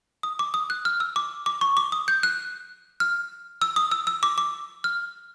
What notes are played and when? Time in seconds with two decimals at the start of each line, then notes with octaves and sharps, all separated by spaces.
0.23 D#6
0.39 D6
0.54 D#6
0.70 F#6
0.85 F6
1.00 E6
1.16 D6
1.46 D6
1.61 C#6
1.77 D6
1.92 D#6
2.08 G6
2.23 F#6
3.00 F6
3.62 E6
3.76 D#6
3.91 E6
4.07 E6
4.23 D6
4.38 D6
4.84 F6